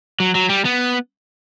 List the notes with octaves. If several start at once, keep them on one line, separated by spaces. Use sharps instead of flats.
F#3
F#3
G3
B3